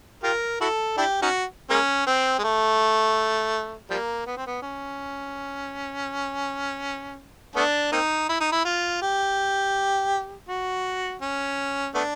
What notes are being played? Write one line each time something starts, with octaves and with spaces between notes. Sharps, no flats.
F4 G4 A#4
E4 F#4 A4
D4 E4 G4
C#4 D#4 F#4
G#3 A#3 C#4
C4
G#3
A3
F3 G3 A#3
B3
C4
B3
C#4
A3 B3 D4
A#3 C4 D#4
E4
D#4
E4
F4
G4
F#4
C#4
A3 B3 D4